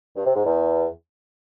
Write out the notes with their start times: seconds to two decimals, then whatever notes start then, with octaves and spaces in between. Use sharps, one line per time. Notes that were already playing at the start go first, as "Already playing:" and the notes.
0.16 G2
0.26 C3
0.35 G#2
0.45 E2